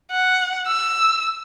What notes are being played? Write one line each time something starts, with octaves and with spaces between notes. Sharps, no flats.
F#5
E6